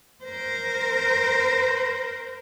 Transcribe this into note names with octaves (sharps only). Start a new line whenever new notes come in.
A#4 C5